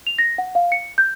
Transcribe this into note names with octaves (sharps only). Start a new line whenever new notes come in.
F7
A#6
F#5
F5
C#7
G6